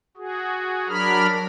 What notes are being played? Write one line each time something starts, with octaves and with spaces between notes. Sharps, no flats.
F#4 G#4
F#3 D4 A#4 B5 F6